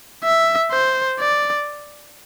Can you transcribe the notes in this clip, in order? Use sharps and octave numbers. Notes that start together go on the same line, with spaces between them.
E5
C5
D5